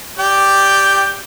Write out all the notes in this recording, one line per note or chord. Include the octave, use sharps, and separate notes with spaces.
G4 D5 G5